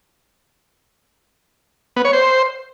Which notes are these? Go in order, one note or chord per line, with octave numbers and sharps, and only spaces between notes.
B3
C#5
C5